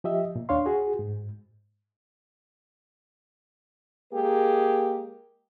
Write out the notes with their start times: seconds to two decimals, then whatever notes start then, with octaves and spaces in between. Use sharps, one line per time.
0.04 F3 G4 D#5 E5
0.36 A#2
0.49 D#2 D4 C#5 F5 C6
0.66 F#4 G#4
0.99 G#2
4.12 G#3 A#3 G4 G#4 A#4